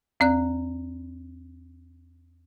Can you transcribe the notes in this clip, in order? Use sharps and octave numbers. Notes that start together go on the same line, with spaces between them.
E2 C4 D5 F#6